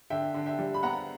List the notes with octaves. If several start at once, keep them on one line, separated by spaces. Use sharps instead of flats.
D3 E5 G5
D3
E5 G5
G3
B5
B3 F#5 A#5